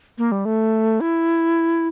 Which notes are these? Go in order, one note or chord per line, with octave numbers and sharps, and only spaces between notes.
A#3
G3
A3
E4